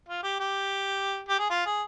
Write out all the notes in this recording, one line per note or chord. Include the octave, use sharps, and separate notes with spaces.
F4
G4
G4
G4
G#4
F4
G#4